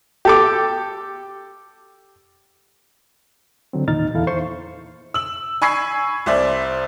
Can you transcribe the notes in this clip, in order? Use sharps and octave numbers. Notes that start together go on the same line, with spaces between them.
G4 A4 D6
D3 F#3 C4
E2 A#2 D#3 D#4 F6 A6
E2 E4 A4 F5
C5 C6 C#6
E6 F#7
G#5 B5 C#6 E6 G#6 C7
C2 C5 D5 E5